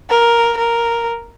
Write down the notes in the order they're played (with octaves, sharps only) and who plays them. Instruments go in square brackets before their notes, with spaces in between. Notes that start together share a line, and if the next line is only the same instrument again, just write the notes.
[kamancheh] A#4
A#4